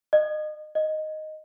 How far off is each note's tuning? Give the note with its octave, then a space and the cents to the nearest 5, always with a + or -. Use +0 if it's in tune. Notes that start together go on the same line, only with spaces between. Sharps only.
D#5 -30
D#5 +0